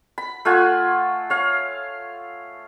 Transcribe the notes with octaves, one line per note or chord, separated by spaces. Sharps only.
B5
A3 F4 F#5 G#5
C#5 F5